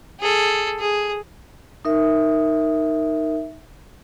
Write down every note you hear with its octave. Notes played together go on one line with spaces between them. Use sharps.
G#4 A4
G#4
D#4 A#4 E5